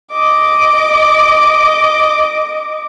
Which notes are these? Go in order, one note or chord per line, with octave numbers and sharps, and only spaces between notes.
D#5 D6